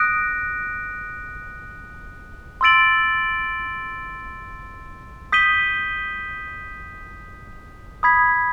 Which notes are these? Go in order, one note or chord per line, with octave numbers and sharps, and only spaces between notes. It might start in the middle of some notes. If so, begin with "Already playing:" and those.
Already playing: D#6 F#6 A#6 D7
C6 E6 A6 D7 F#7
D#6 G6 B6 D#7 G7
B5 D#6 G#6 B6